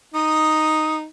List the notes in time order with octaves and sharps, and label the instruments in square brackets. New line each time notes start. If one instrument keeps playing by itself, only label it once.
[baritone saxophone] D#4 [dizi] D#6